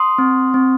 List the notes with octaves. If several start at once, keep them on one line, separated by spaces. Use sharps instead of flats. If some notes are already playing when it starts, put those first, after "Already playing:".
Already playing: C6 D#6
C4
C4